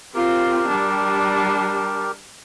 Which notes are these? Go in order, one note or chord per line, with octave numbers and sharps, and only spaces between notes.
C4 F4 G4 A#4
G3 D4